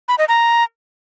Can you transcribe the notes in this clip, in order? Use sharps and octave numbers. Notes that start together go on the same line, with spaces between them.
B5
D#5
A#5